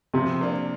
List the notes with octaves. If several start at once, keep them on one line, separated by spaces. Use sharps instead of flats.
C3 F3
A#3 D4